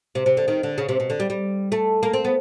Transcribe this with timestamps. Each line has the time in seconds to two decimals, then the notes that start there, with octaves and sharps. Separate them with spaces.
0.15 C3
0.26 C3
0.37 D3
0.48 D#3
0.63 D3
0.78 C#3
0.89 C3
1.00 B2
1.10 D3
1.20 G3
1.30 G3
1.72 A3
2.03 A#3
2.13 C4
2.25 B3